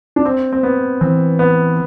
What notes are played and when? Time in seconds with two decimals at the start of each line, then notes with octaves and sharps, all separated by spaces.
0.16 D4
0.25 C4
0.53 C4
0.63 B3
1.01 E3 C4
1.39 B3